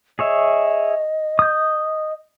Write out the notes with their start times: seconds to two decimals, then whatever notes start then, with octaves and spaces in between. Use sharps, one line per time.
0.19 G#4 C#5 D#5 E5
1.39 D#6 G6